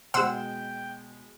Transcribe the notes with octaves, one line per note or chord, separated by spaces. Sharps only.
B2 G#3 C5 F#5 G5 E6